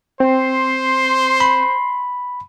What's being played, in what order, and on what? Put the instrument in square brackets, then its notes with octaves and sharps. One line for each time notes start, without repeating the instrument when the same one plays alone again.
[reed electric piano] C4 [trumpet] C5 [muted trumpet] C6
[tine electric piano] B5